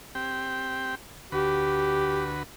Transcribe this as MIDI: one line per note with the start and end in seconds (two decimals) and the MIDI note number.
0.15 0.95 60
0.15 0.95 67
0.15 0.95 79
1.32 2.43 38
1.32 2.43 66
1.32 2.29 67
1.32 2.43 71